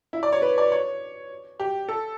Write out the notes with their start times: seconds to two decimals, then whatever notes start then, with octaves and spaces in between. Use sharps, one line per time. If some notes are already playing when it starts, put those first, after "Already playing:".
0.13 E4
0.23 D5
0.32 C#5
0.42 B4
0.58 D5
0.72 C#5
1.60 G4
1.88 A4